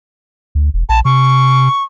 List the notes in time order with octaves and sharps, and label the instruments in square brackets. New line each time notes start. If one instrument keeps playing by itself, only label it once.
[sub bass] D2
E1
[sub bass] A#1 [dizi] A5
[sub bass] C3 [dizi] C#6